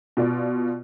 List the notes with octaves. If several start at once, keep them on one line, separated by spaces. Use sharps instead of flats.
B2 F4 D5